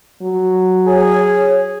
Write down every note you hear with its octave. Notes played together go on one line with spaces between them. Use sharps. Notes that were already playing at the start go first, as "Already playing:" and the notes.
F#3
G#4 C#5